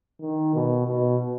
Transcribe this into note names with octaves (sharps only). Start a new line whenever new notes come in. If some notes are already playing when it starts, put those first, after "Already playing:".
D#3
B2
B2